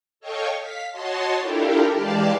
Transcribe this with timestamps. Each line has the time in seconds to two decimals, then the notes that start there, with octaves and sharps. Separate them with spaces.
0.20 A4 C#5 D#5 F5 G5 C#6
0.59 F5 B6
0.91 F#4 C#5 D#5 A5 C6
1.38 D4 E4 F4 G4 A4 A#4
1.90 E3 G#3 G4 D5 F5 A5